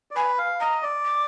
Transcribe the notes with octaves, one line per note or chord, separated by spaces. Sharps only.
D5
B4 G#5
F5
D#5 A#5
D5
D6